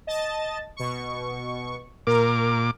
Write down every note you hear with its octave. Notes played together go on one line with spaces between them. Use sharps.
D#5 A5 A6
B2 C#6
A#2 A#4 D6